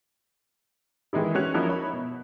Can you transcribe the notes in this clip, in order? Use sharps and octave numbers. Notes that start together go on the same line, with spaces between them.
D#3 E3 G#3 D#4 E4
C#4 F#4 C#5 F#6 F7
F3 A#3 C#4 D#4 E4 F#4
C#5 E5 B5
B2